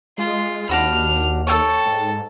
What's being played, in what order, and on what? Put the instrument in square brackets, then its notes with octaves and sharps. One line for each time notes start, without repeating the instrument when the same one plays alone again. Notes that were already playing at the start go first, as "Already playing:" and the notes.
[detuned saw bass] G#3 [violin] F4 C7
[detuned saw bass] D#2 [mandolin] D4 F#4 B5 [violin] F6
[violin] A4 A5 [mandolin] C#5 G5 E6
[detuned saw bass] G#2